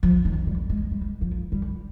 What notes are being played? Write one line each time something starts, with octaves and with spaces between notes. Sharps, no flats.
F3
D#3
G3
G#3
G3
F3
G3